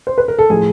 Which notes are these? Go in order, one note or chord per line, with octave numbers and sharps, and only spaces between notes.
C5
B4
A#4
A4
A2 F3 G#4